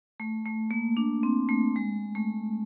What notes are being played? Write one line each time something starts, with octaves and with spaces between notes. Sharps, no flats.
A3
A3
A#3
D4
C4
A3
G#3
A3